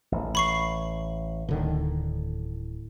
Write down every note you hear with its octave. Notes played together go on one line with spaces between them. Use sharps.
A1
B5 C#6 C7
D1 A2 D3 D#3